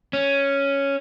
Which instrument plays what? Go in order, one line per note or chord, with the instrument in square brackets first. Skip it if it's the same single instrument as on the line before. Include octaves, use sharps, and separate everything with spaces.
[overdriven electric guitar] C#4